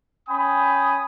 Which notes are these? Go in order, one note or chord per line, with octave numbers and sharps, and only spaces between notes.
C#4 G5 G#5 B5 D#6